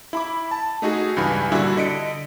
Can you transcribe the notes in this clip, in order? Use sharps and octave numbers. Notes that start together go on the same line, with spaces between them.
E4 B5 D6
A5
A3 D#4 F#4 G#4
C#2 G2 E3 G#5
A#2 D3 G3 E4 F#4
D3 D#5 B6 C#7 D7